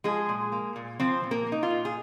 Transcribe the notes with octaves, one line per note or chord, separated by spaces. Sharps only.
F3 G#3 G#4
A#2
A#3
A#2
F3 C4 C5
A#2
A#3 A#4
A#3
D#4
F4
A#2
G#4